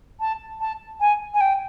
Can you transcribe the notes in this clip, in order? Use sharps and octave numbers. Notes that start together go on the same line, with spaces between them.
A5
A5
G#5
G#5
G5